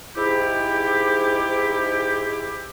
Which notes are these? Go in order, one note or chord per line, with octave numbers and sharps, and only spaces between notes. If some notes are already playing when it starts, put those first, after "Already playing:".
G#2 E4 G4